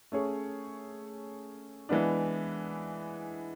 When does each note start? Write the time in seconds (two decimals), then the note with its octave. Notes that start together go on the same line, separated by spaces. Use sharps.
0.12 A3 C#4 G#4 C#5
1.89 E3 G#3 B3 D4